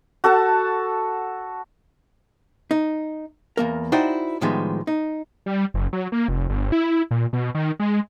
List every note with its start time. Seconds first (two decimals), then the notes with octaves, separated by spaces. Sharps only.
0.24 F#4 A4 F#5 A5
2.71 D#4
3.57 E2 A#3 A#4
3.92 D#4 E4 F#4 C5 D5 G5
4.41 A2 D#3 F3 G3 G#3 B3
4.87 D#4
5.46 G3
5.74 F#1
5.93 F#3
6.12 A#3
6.29 F1
6.49 G1
6.72 E4
7.11 A#2
7.33 B2
7.55 D#3
7.80 G#3